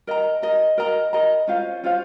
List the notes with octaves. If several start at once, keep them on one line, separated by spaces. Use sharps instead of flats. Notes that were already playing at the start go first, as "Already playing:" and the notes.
A#4 D#5 A#5
A#4 D#5 A#5
A#4 D#5 A#5
A#4 D#5 A#5
C#4 F4 C5 F5
C#4 F4 C5 F5